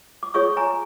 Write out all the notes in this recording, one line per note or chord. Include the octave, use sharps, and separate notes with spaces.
D6
F4 G#4 C#5 C#6 D#6
G#5 A#5